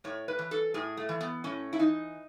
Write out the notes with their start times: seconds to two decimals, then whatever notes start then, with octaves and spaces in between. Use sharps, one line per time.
0.04 A2 C#5
0.28 B4
0.39 E3
0.51 A4
0.74 A2 G#4
0.97 A3
1.09 E3
1.21 B3
1.44 A2 C#4
1.73 E4
1.79 E3 D#4